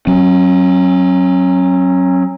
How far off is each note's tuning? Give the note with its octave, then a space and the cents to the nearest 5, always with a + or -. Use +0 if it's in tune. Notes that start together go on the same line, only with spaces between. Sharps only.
F#3 +0 C#4 -35